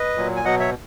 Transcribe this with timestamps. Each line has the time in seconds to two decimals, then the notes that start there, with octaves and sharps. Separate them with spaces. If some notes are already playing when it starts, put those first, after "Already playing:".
Already playing: B4 D#5
0.16 A#2 F#3
0.36 G#5
0.45 B2 F#3 D#5 F#5
0.60 C#5 E5